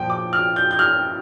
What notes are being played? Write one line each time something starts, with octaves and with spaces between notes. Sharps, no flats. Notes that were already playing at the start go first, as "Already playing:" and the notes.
Already playing: A#2 F3 G5
D6
F6
G6
G6
F6